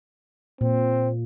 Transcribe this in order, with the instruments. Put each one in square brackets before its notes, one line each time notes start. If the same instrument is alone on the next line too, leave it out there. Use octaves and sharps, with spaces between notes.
[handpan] A#2 [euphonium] C4